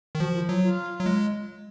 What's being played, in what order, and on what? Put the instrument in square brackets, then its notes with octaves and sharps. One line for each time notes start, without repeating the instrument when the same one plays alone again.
[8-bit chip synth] D#3
[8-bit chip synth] F3 [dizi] F#4
[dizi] F4
[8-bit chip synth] F#3 [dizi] F4
[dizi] F4
[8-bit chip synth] F#3
G#3